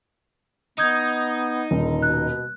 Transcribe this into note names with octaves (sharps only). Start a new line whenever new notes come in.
B3 D#4 D#6 G6 G#6
D#1 D3
B2 F#6